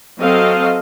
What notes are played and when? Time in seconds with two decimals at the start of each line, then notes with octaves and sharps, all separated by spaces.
0.21 F#3 C4 A4 D#5 F5